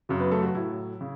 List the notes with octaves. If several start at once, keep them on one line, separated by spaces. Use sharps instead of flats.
F#2 C#3 F#3
B3 B4
A3 A4
F#4
A2 F#3 E4
C#3